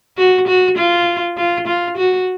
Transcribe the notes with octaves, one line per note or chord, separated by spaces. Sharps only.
F#4
F#4
F4
F4
F4
F#4